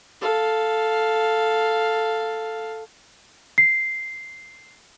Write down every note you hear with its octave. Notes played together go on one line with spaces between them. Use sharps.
A4 F5
C7